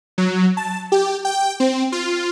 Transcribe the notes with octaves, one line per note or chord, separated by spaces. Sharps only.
F#3
A5
G4
G5
C4
F4